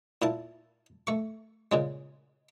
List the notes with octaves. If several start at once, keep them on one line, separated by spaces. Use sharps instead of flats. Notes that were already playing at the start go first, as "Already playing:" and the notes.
A#2 E4 A5
A3 C#6
A#2 C#3 G#3